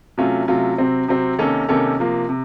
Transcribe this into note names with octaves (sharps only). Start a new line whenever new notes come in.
C3 F#3 A3 C#4 F4
C3 F#3 A3 C#4 F4
C3 F#3 C4
C3 F#3 C4
C3 D#3 A#3 C#4 A4
C3 D#3 A#3 C#4 A4
C3 F3 A#3
C3